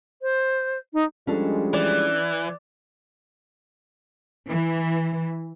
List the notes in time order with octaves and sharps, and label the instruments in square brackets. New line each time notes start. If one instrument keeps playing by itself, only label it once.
[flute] C5
D#4
[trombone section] F3 G3 G#3 [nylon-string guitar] C#4 D4 A4
[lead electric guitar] E3 [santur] D5
[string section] E3